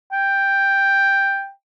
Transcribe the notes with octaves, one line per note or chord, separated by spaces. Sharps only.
G5